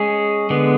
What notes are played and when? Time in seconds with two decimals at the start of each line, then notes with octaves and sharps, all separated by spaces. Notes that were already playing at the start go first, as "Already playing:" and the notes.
Already playing: G#3 C#4 G#4
0.50 D3 G#3 B3